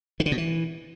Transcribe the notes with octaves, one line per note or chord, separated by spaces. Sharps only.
D#3
D3
B2
E3